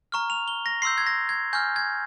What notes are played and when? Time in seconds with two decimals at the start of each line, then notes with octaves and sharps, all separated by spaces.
0.12 A#5 C#6 F6
0.30 F7
0.48 G7
0.66 A#6
0.82 C6 E6 G6 C7
0.98 G#6
1.07 A#6
1.29 G#6
1.53 G#5 C#6 F6 G6
1.76 G#6